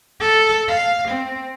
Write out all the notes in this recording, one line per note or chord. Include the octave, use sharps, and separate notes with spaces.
A4
F5
C4